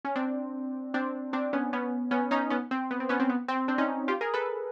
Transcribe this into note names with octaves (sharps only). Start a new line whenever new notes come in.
C#4
C4 D4
C4 D4
C4 D4
B3 C#4
B3 C#4
B3 C#4
C#4 D#4
B3 C#4
C4
B3
C4
B3 C#4
C4
B3
C4
C4 D4
C#4 D#4
F4 G4
G#4 A#4
A4 B4